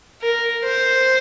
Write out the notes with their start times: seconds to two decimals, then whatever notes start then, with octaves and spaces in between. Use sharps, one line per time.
0.22 A#4
0.64 C5